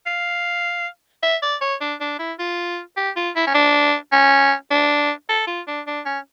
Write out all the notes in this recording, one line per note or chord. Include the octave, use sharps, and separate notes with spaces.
F5
E5
D5
C#5
D4
D4
E4
F4
G4
F4
E4
C#4
D4
C#4
D4
A4
F4
D4
D4
C#4